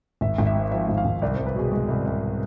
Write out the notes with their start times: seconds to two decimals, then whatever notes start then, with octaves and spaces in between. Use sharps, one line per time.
0.21 G#1 E5
0.38 G#1
0.46 E5
0.55 G#2
0.72 F3 E5
0.89 G#1
0.98 F5
1.05 G#1
1.22 C2 D5
1.35 C5
1.39 C2
1.47 B4
1.55 B2 G#4
1.72 G#3
1.88 C2
2.06 C2